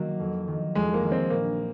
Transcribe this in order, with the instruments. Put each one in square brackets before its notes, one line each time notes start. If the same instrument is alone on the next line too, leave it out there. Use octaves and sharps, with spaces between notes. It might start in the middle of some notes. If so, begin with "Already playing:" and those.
Already playing: [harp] D#3 F#3 [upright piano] A#3
[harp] F2
D#3 F#3
[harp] F2 [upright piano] G#3
[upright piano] A#3
[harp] D#3 F#3
[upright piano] C4
[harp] A#1 [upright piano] A#3